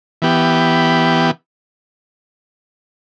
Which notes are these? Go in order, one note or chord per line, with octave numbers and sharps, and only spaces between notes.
E3 B3 G4